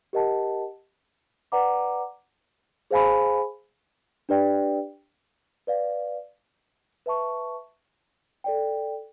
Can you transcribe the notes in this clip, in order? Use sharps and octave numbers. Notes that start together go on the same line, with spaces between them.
G4 A#4 D#5 F#5 A5
B4 D5 F#5 A#5 D6
G#4 C5 F5 G#5 B5
D4 G4 B4 D5 G5
B4 D5 F5
B4 E5 A5 C#6
A4 D5 G5